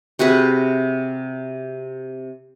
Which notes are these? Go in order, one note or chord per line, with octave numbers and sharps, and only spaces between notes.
C3 F#4 G#4 B4